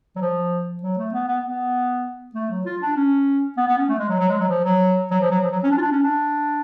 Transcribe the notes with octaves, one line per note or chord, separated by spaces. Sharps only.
F#3
F3
F#3
A3
B3
B3
B3
A3
F#3
F4
D4
C#4
B3
B3
C#4
A3
G#3
F#3
F#3
G#3
F#3
F3
F#3
F#3
F3
F#3
F3
F#3
C#4
D4
F4
D4
C#4
D4